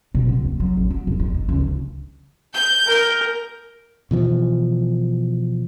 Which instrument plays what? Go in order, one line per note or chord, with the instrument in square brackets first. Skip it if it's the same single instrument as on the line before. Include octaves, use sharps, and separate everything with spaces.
[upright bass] B2
C2
D#2
F#3
A1
F#3
E1
D#3
D#3
C#2
D3
[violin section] G6
[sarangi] A#4
[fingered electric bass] B2 E3 F3